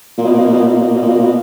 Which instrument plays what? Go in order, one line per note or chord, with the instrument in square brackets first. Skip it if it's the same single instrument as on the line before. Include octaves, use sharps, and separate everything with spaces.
[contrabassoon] A#2
B2
A#2
B2
A#2
B2
A#2
B2
A#2
B2
A#2
B2
A#2
B2
A#2
B2